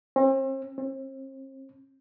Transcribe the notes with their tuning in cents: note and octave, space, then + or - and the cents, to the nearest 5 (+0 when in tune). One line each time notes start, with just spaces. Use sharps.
C4 +40
C4 +40